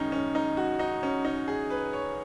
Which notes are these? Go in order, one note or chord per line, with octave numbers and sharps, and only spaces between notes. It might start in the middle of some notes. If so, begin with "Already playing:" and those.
Already playing: F#2 D#3 G#3 C#4 D#4
C#4
D#4
F#4
D#4
C#4
D#4
G#4
B4
C#5